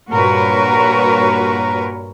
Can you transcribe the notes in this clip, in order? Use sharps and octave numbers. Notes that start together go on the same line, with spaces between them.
G2 A#2 F#4 A#4 B4 C#5